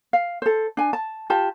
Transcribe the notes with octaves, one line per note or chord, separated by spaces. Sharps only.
F5
A4 C5
D4 G#5
A5
F4 G4 A5